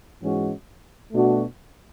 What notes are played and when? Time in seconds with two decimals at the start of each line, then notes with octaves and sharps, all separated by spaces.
0.21 G#2 E3 G#3 C#4 F#4
1.12 B2 A3 D4 F#4